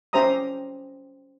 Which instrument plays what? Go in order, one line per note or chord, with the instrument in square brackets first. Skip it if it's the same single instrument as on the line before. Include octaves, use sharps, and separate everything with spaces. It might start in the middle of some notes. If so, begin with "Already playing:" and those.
[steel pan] C#4 G4 C5 E5 A#5 D#6